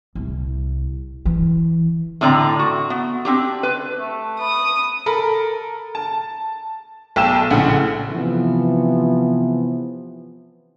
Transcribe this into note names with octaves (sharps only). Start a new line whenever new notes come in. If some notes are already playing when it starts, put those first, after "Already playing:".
C2
E3
A2 D3 C4 D5 A#5
F#4
B3
C4 D4 G4
B4
A3
B4 D#6
A4 A#4 B5
A5
B1 G5 A5 E6 E7
A#1 A2 C#3 F#5
C3 E3 F3 B3